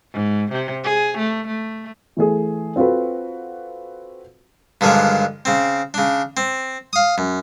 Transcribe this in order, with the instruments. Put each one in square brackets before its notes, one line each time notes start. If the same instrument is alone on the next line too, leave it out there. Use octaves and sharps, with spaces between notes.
[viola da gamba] G#2
C3
G#4
A3
A3
[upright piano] E3 A3 G#4
C4 F4 F#4 A4 B4
[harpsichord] G2 D3 D#3 F3 G#3
C#3 C4
C#3 D4
C4
F5 D#6
F#2